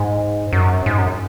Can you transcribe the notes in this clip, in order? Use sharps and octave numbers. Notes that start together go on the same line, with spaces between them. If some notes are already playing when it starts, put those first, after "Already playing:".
Already playing: G#2
F#2
G#2
F#2